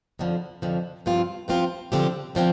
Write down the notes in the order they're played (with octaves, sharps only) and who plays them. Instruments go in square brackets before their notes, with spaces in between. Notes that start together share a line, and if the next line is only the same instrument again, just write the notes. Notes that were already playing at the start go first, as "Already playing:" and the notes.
[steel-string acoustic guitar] F2 D3 F3
F2 D3 F3
G2 F3 C4 F4
G2 F3 C4 F4
D3 F3 C4 G4
D3 F3 C4